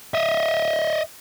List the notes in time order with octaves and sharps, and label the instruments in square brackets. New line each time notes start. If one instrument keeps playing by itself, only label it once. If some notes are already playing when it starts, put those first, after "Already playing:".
[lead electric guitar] D#5 E5